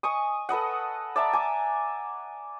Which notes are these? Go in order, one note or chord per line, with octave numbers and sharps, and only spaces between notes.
D#5 G#5 C#6 D#6
A4 B4 D#5 F#5
D5 E5 A5 A#5
G#5 D6